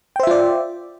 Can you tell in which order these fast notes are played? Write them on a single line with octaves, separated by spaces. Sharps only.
G5 C5 E5 F4 D5